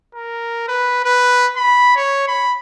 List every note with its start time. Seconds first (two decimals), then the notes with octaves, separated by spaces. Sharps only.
0.14 A#4
0.68 B4
1.05 B4
1.56 B5
1.96 C#5
2.28 B5